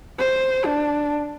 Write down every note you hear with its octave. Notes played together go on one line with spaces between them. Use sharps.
C5
D4